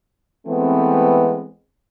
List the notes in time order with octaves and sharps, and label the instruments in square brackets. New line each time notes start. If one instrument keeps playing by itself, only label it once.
[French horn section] E3 G#3 A3 B3 C4